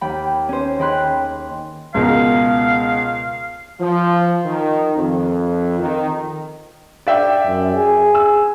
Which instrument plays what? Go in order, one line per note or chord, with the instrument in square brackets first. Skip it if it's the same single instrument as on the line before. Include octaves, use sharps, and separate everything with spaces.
[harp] D#2 G5 B5
C#4 C5
D#3 G#4 G5 B5 C6 F#6
[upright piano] C#2 B2 A#4 [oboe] F5
[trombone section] F3
D#3
F2
D#3
[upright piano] D5 E5 G5
[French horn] F#2
G#4
[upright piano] E6